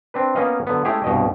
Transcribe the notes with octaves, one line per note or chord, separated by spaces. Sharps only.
C4 D4 B4
A#3 B3 C#4 B4 D#5 F5
D3 F#3 B3
G#3 A3 C#4 E4 G4 G#4
C2 G2 B2 G4 D#5